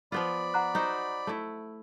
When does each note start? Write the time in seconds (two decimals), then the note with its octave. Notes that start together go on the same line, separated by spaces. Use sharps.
0.12 F3 B3 F4 D5 B5
0.54 F#5 A#5 F#6
0.75 D#4 F#4 C5
1.27 A3 E4